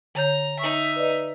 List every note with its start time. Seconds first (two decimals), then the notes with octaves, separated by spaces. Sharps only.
0.15 D3 C#5 A#5 G6
0.59 D#4 E5 C#6
0.96 B4 D5 D#5